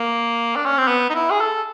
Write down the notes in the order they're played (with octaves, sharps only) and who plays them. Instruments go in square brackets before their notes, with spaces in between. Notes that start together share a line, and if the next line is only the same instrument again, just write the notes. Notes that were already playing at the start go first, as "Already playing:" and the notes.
Already playing: [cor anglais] A#3
D4
C#4
C4
B3
D#4
E4
G#4
A4